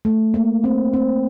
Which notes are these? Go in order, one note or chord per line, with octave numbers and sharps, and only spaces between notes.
A3
A#3
C4
C4